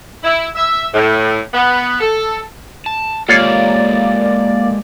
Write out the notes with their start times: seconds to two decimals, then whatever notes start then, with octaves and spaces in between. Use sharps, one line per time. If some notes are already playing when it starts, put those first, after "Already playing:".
0.23 E4
0.55 E5
0.94 A2
1.54 B3
2.01 A4
2.86 A5
3.29 G#3 A#3 F4 G4 A4 C#5 D5